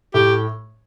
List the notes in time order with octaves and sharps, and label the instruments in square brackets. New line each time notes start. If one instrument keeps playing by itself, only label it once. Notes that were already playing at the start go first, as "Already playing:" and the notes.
[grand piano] A2 [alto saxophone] G4